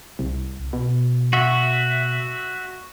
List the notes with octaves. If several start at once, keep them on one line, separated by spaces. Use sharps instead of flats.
C2
B2
F#4 E5